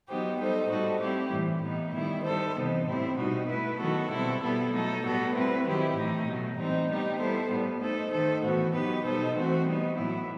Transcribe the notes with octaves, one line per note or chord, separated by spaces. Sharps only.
F#3 B3 D#4 G4 C5
G3 D#4 A4 C5
A2 G3 D#4 F#4 A4
G3 C4 E4 G4
A2 E3 G3
A2 E3 B3 D#4
D#3 G3 B3 E4
G3 D#4 A4 C5
C3 E3 B3 D#4
A2 G3 C4 E4
B2 G3 D#4 F#4
A3 E4 B4
D#3 F#3 B3 F#4 A4
B2 G3 C4 E4 A4
B2 G3 B3 E4 A4
F#3 A3 D#4 A4
A2 G3 B3 F#4 A4
G3 C4 E4 B4
D#3 F#3 C4 E4 G4
A2 E3 A3 D#4
B2 F#3 A3
A2 E3 G3 C4 D#4
G3 B3 D#4 G4
G3 B3 E4 A4 C5
A2 G3 B3
A3 D#4 A4 C5
D#3 A3 D#4 A4 C5
A2 E3 B3 F#4
F#3 B3 D#4 G4 B4
B2 G3 D#4 A4 C5
E3 A3 C4 F#4
G3 B3 D#4
A2 F#3 B3 E4